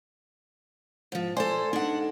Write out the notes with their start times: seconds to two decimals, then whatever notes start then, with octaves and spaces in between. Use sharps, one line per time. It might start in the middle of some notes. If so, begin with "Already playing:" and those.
1.12 G#2 F3
1.37 A4 C5 D5 G#5 C6
1.73 D4 D#4 A4 F#5